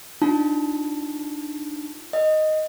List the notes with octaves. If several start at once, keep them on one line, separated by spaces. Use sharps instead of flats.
D4 D#4 F4 A5
D#5